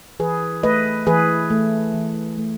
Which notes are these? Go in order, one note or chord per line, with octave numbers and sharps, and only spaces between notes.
E3 G#4 B4
A3 B4 D#5
E3 G#4 B4
A3
E3
A3